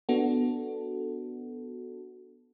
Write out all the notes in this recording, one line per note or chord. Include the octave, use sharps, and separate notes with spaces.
B3 D4 F#4 A4